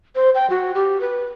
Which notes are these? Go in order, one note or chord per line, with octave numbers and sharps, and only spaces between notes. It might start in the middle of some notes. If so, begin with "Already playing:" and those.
C5
G5
F#4
G4
B4